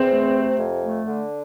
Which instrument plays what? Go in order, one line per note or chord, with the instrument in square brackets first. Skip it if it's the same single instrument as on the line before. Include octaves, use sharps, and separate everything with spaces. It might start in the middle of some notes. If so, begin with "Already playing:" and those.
Already playing: [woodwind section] E2 [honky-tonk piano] C4
[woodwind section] A3
C3
F2
A3
D3